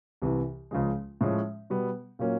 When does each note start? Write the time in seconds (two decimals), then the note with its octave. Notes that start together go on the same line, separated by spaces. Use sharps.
0.22 C2 C3 E3
0.71 C#2 C#3 F3 G#3
1.21 A2 F3 G#3 C#4
1.70 B2 G3 B3
2.19 A#2 F#3 A#3 C#4